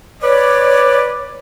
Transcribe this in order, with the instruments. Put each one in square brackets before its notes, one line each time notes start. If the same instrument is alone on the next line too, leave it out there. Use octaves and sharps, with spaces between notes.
[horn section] B4 D5 [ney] C#5